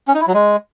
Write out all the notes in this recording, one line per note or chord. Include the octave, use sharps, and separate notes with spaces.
C#4
D#4
E4
F#3
G#3